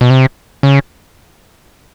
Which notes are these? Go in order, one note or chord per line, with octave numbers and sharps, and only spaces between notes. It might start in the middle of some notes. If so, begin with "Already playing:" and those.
B2
C3
C#3